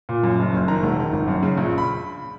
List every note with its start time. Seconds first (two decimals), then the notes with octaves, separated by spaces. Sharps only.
0.09 A#2
0.24 F#2
0.38 F#1
0.53 F#1
0.68 D#3 A#5
0.83 E1
0.98 D#3
1.13 G#1
1.28 F#2
1.43 C#3
1.57 A#1
1.78 B5